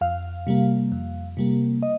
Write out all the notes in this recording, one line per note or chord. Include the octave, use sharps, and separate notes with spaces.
F2 F5
C3 G3 A#3
F2
C3 G3 A#3
D#5